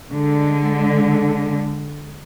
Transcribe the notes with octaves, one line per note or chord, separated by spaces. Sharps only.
D3 G#3